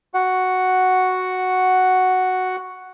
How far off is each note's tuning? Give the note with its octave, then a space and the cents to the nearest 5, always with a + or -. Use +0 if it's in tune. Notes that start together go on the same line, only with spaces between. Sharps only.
F#4 +0 F#5 +0